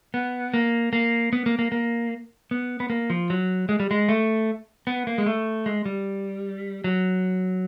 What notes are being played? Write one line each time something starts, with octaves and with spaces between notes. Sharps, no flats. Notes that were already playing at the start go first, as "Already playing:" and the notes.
B3
A#3
A#3
B3
A#3
A#3
A#3
B3
B3
A#3
F3
F#3
G#3
G3
G#3
A3
B3
A#3
G#3
A3
G#3
G3
F#3